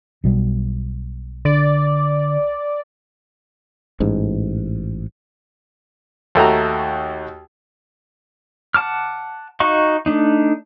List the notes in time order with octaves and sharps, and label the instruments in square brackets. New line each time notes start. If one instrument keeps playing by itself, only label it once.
[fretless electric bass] B1 B2 G3
[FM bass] D3 [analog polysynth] D5
[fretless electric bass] A1 G#2
[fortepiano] D#2 A3 F#4 A#5
[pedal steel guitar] F#5 A5 D6 F6
D#4 F#4 D#5 F5 C#6
A3 D4 D#4